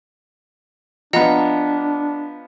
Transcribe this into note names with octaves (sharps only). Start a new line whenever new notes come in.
F3 B3 D4 D#5 F#5 A#5